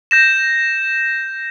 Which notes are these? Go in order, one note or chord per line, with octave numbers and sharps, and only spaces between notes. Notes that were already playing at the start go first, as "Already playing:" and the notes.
G6 A#6 E7